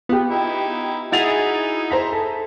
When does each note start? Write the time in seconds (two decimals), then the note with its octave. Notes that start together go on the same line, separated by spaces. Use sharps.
0.09 B3 F4 G4
0.30 D#4 E4
1.12 D#4 E4 F#4 G#4 A6 F7
1.90 C5 A#5 B6
2.12 A4